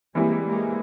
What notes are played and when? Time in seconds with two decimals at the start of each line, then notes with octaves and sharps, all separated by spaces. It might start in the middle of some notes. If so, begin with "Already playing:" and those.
0.15 E3 G3 G#3 A#3 C4 E4 G4
0.46 G#3 A#3